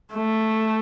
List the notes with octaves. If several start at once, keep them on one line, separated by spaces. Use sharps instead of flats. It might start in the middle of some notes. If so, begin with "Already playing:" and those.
A3